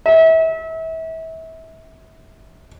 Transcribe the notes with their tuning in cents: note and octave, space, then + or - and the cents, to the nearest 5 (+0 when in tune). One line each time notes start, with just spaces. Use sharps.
E5 -30